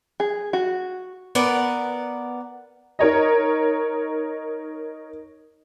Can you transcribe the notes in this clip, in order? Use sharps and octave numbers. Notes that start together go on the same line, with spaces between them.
G#4
F#4
B3 A#4 D5 F#5
D#4 A#4 C#5 D#5